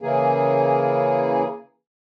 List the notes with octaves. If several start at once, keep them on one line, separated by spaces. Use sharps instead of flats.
C#3 E3 A#3 G#4